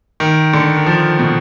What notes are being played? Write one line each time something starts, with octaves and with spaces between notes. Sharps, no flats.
D#3
D3
D#3
F3
B2